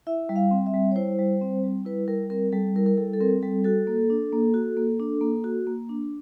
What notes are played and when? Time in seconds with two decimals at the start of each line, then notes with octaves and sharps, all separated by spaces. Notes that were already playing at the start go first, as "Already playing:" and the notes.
0.07 E4 E5
0.29 G3
0.36 F5
0.51 C4
0.66 E5
0.74 G3
0.91 C#5
0.96 E4 C5
1.19 G3
1.41 C4
1.63 G3
1.85 E4 B4
2.08 G3 A#4
2.30 C4 A#4
2.52 G3 A4
2.75 E4 A#4
2.86 A#4
2.97 G3 A4
3.14 A4
3.21 C4 A#4
3.42 G3 A4
3.65 F#4 A4
3.87 A#3
4.10 D4
4.32 A#3
4.54 F#4
4.77 A#3
5.00 D4
5.21 A#3
5.44 F#4
5.67 A#3
5.89 D4